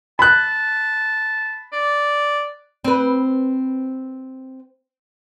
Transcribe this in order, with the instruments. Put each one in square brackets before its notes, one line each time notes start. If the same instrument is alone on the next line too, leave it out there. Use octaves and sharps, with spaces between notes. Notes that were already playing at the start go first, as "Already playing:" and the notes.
[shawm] A5 [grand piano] B5 F#6
[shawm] D5
[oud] C4 B4